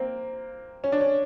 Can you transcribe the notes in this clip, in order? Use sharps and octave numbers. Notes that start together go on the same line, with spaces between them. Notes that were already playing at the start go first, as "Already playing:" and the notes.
Already playing: A#3 C4
C#4
D4
C#4